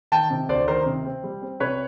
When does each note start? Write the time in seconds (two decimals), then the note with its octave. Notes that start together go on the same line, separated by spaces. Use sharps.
0.12 D#3 G5 A5
0.30 C3
0.49 D2 C5 D5
0.68 D#3 A#4 C5
0.86 C3
1.05 C4
1.24 G3
1.42 C4
1.60 C3 B4 C#5